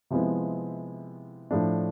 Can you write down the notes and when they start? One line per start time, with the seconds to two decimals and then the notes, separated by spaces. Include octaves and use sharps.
0.10 C3 F3 G#3 B3 E4
1.51 A2 F3 A3 D4